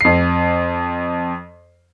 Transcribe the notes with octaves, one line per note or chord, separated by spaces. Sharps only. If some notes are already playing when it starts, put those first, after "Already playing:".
F2 C7